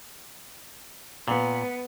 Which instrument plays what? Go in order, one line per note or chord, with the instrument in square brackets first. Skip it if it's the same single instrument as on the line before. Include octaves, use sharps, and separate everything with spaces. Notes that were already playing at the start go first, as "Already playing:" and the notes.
[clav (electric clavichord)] A#2 [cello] B3